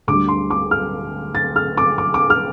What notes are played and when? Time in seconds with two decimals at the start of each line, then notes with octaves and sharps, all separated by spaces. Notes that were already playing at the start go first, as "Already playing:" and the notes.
0.07 D2 D3 G3 D6
0.28 C6
0.50 D6
0.71 F6
1.35 A6
1.56 F6
1.77 D6
1.98 D6
2.14 D6
2.30 F6